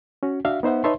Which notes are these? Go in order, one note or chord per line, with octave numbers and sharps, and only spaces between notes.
C#4 F#4
D4 F#4 E5 F5
B3 D#4 C5 E5 F#5
D#4 B4 C#5 E5 A5 C6